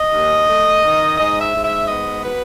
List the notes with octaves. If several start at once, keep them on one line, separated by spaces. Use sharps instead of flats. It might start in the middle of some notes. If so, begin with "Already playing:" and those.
Already playing: D#5
D#2
A3
D#3
G#2 D#5
E5
G#2
E5
B3 D#5
F#3 B4